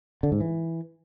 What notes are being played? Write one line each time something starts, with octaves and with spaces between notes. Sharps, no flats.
D3
G#2
E3